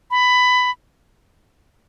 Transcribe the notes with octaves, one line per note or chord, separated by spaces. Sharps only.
B5